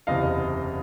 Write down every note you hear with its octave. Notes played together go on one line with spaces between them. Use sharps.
F#1 E2 C3 D#5 F5